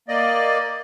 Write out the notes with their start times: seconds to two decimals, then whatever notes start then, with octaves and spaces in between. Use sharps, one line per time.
0.08 A#3 D5 D#5